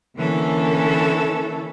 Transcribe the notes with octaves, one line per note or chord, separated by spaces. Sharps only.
D3 E3 A#3 C#4 A4